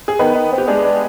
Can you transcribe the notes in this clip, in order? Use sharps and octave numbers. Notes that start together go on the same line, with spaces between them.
G#4
D#3 B3 B4
D#3
C4
G4
G#3 D4 G#4
D4